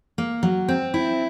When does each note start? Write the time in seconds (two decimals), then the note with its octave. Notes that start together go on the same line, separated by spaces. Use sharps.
0.18 A#3
0.43 F#3
0.68 C4
0.94 E4